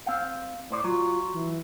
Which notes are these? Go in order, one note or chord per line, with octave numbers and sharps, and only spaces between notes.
C4 F5
A2 C5 D5
F#3 F4
E3